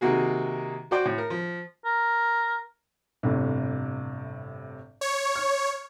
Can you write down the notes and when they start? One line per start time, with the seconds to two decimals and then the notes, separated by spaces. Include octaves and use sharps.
0.01 C3 D#3 A#3 F#4 G#4
0.91 F#4 C5 D5 G5
1.05 A2
1.18 A#4
1.30 F3
1.85 A#4
3.23 G1 A2 C3
5.01 C#5
5.35 F6